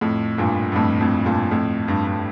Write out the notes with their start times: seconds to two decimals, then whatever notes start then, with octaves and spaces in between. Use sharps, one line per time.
0.01 F2 A2
0.38 G2 A#2
0.72 G2
0.76 F2 A2
1.00 F2 A2
1.25 G2 A#2
1.51 F2 A2
1.88 G2
2.07 G2